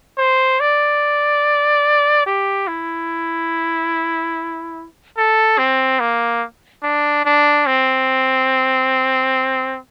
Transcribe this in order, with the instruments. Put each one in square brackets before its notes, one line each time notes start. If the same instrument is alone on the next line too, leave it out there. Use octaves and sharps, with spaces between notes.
[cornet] C5
D5
G4
E4
A4
C4
A#3
D4
D4
C4